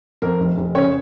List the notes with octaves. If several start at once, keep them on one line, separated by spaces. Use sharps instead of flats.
F2 A#4
F1
F1
C#3 C#5